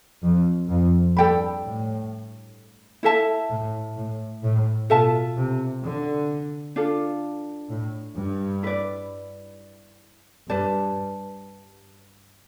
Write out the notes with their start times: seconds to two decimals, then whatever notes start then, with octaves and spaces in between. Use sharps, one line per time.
0.23 F2
0.70 F2
1.17 G2 A4 D5 G5 B5
1.64 A2
3.03 E4 A4 E5 A5
3.51 A2
3.97 A2
4.43 A2
4.90 B2 F4 A4 E5 A5
5.37 C3
5.83 D3
6.76 D4 F4 A4
7.69 A2
8.15 G2
8.63 E4 B4 D5
10.48 G2 B4 D5 A5